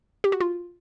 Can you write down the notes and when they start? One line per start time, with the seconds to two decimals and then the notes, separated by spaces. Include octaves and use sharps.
0.24 G4
0.32 F#4
0.40 F4